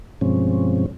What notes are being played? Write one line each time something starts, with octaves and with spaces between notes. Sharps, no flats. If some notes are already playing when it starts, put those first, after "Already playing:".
G2 B2 F3 G#3 C4 C#4